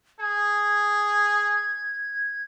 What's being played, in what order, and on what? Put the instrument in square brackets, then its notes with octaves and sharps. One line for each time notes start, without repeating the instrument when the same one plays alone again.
[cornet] G#4 [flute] G#6